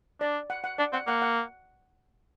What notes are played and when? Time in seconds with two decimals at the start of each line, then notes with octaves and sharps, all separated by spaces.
0.21 D4 D5
0.50 F#5
0.64 F#5
0.78 D4 D5
0.93 C4 F#5
1.07 A#3 F#5
1.22 F#5